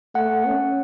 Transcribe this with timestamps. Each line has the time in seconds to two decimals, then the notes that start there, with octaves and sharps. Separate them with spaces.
0.15 A3 F#5
0.47 C#4